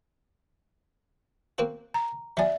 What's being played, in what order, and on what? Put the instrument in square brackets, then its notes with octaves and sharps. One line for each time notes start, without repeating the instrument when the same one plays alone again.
[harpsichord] A#3 C4 F#4
[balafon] A#5
[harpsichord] F#3 G#5 [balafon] D5 E5